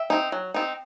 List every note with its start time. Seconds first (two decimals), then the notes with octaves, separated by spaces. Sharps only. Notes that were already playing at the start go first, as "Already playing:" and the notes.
Already playing: E5 G5
0.10 C4 D#4
0.32 F#3
0.54 C4 D#4